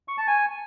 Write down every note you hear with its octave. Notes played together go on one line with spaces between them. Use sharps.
C#6
A5
G#5